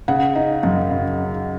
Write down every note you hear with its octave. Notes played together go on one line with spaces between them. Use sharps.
C#3 F#5
D#4
F#2
C#3